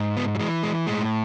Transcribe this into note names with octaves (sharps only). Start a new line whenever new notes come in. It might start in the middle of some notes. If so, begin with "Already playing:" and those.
Already playing: G#2
B3
F#3
E3 G#3
G#3
A2 G#3